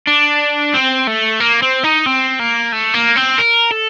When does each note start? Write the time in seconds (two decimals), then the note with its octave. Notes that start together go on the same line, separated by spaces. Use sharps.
0.07 D4
0.74 C4
1.07 A3
1.40 A#3
1.63 C4
1.84 D#4
2.06 C4
2.39 A#3
2.72 A3
2.94 A#3
3.17 C4
3.39 A#4
3.71 A4